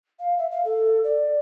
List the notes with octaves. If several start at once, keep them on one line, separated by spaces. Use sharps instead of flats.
F5
E5
F5
A4
D5